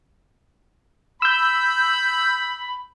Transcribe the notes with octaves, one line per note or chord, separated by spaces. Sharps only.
B5 E6 G6